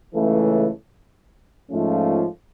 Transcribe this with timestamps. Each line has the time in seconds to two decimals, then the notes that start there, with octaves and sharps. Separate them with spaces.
0.14 C#2 C#3 E3 A3
1.71 G#2 F3 A3 C#4 F4